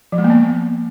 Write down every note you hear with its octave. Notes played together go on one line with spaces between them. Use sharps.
F3
G#3
A#3
B3